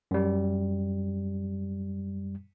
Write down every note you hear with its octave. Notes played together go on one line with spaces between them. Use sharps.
F#2 G3